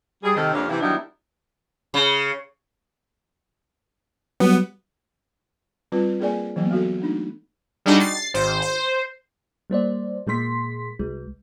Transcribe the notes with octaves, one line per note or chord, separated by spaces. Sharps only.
G3 G#4
C3 D#3 A4
F2 A#3 D4 G4 C#5 F5
C3 E3 E4
D#3 F#3 G3 B3 D4 E4
C#3
F#3 G3 B3
G3 C4 F4 B4
A#3 G#4 A#4 D5 G#5
E3 F#3 A#3 B3
G#3 F#4 A4
A3 D4 D#4
G3 G#3 D4 D#4 F#4
A6 C7
G#1 C5
C5
G3 A#3 C5 D5
A#2 G#3 A#3 C6 B6
C2 G#3